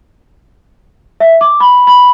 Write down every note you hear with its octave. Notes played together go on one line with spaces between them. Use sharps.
E5
D6
B5
B5